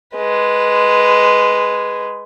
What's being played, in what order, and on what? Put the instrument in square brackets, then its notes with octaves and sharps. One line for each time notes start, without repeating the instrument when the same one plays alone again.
[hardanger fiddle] G#3 B4